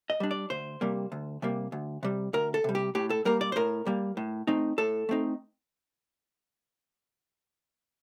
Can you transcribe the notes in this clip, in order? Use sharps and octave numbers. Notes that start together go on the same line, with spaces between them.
D#5
G3 D4
D5
D2 C5
C3 G3 A#3
D2
C3 G3 A#3
D2
C3 G3
D2 A#4
A4
C3 G3
G4
A2 G4
A4
G3 A#3 A#4
D5
C5
A2 A#4
G3 A#3
A2
A3 C4 D#4
A2 A4
A3 C4 D#4